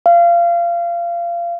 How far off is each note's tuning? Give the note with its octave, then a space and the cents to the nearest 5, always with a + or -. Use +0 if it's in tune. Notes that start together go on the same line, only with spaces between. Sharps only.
F5 -25